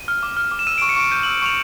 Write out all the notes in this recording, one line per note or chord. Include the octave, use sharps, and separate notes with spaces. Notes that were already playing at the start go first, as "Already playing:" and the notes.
Already playing: D#7
F6
D6
F6
D6
E7
E6 D#7
D7
C#6
C#7
C#6 D7
G6 D#7
F#7
E6
C#6 F7